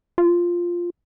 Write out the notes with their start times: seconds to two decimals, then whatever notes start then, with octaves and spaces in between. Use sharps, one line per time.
0.18 F4